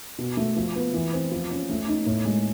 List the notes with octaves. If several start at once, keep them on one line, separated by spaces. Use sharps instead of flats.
B2
A3
F3
B3
E3
C4
F3
C#4
A3
D#4
A2
G#3